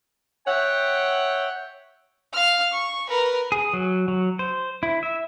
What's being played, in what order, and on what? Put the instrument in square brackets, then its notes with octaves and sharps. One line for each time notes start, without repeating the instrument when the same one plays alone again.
[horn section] C#5 E5 F#5 G5
[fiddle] F5 F6
C#6
A#4 B4
[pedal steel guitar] G#4
F#3
F#3
C5
E4
E5